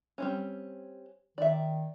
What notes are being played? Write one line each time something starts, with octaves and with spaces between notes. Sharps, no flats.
G3 C4 C#4
D#3 D5 E5